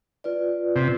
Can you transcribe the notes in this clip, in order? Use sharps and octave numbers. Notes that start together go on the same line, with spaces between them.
F4 B4 D5
C3